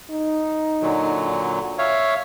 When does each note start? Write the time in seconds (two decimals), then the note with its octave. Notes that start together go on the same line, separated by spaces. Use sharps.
0.10 D#4
0.82 A#2 D3 F#3
1.79 C#5 E5 F5